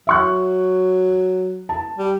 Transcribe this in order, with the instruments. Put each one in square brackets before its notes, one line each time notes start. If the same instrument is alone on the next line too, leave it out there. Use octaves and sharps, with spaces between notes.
[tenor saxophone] F#3 [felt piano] E5 C#6 F#6
[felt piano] A5
[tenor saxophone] G3